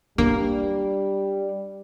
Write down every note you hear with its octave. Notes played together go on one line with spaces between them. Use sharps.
G3 A#3 D4